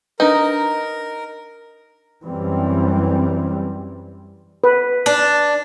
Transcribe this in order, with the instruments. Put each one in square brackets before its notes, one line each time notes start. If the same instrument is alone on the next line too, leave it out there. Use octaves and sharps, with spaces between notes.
[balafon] D4 B4 [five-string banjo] D#4 [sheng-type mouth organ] A#4
[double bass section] F#2 E3 G3 C4
[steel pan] B4
[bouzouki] D4